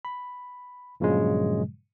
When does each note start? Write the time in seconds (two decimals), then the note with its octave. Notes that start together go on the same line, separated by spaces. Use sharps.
0.05 B5
1.00 G2 A#2 C#3 F3 F#3 G#3